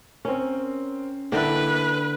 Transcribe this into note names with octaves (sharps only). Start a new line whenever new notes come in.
C4 C#4 A#4
D3 A#3 D4 E4 B4 G5